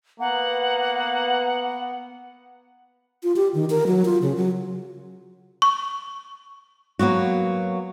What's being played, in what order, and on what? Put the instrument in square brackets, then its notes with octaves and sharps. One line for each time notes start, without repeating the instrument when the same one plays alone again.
[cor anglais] A#3 [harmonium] B3 [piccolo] F#5
[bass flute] F4
G4
D#3
A#4
F#3
F4
C#3
F#3
[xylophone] C#6
[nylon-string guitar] F#3 A#3 B3 F#4